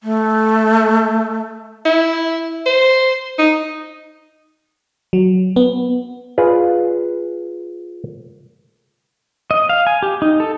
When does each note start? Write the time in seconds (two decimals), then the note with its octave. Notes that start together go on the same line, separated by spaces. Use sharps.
0.04 A3
1.86 E4
2.66 C5
3.38 D#4
5.13 F#3
5.56 B3
6.38 F4 G#4 B4 D5
9.51 D#5
9.69 F5
9.87 G#5
10.03 G4
10.22 D#4
10.40 A4